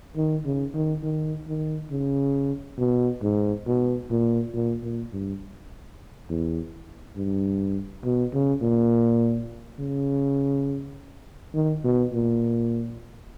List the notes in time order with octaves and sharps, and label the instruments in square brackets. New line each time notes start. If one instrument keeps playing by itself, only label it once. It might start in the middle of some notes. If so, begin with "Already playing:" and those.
[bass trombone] D#3
C#3
D#3
D#3
D#3
C#3
B2
G#2
B2
A#2
A#2
A#2
G2
E2
G2
B2
C#3
A#2
C#3
D#3
B2
A#2